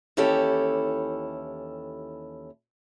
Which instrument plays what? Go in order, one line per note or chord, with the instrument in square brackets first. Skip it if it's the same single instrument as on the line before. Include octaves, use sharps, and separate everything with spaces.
[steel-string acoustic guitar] D#2 E3 C#4 E4 G4 A4